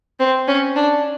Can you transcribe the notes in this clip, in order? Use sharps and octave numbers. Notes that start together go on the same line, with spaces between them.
C4
C#4
D4